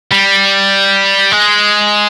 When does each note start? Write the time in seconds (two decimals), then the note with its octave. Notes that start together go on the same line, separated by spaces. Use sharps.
0.11 G3
1.32 G#3